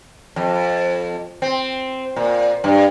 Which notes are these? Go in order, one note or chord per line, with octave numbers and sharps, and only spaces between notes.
F2
C4
A#2
G2